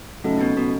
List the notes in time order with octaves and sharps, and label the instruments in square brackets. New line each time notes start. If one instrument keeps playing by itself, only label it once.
[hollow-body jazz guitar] A2 [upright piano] C#3 F#3 A3 D#4 A4
[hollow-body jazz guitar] B2
B2